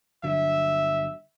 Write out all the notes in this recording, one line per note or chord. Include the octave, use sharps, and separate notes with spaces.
G1 D3 F#3 E5